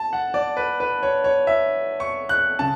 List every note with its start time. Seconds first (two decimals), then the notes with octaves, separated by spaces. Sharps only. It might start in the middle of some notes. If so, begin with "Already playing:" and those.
Already playing: A5
0.13 F#5
0.34 D5
0.57 B4
0.80 B4
1.03 C#5
1.24 C#5
1.47 E5
2.00 C#6
2.29 F#6
2.59 C#3 A5